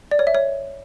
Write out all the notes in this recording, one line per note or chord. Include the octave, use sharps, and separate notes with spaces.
D5
C#5
E5
C#5